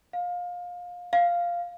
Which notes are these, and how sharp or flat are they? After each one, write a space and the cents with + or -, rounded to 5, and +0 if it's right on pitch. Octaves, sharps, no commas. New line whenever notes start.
F5 +25
F5 -5